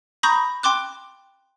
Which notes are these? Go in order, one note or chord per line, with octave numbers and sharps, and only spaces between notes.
A#5 B5 C#6 D#6 G6 A#6
G5 C6 D6 F#6